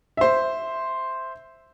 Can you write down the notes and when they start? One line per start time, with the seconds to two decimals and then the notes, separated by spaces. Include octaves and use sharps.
0.17 C5 E5